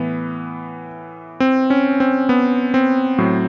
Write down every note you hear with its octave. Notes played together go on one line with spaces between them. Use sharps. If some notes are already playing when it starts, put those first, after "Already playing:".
Already playing: A2 E3 B3
C4
C#4
C4
B3
C4
A2 F#3